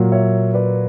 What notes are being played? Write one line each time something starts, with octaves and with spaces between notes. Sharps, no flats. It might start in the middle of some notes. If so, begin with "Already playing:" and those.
Already playing: A#2 F#3 A#3
C#5 E5
B4 D5